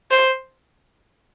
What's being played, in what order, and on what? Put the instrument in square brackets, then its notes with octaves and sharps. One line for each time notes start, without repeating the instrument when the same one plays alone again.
[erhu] C5